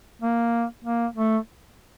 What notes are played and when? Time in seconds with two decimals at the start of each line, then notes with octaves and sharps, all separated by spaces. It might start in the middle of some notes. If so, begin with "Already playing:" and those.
0.22 A#3
0.84 A#3
1.15 A3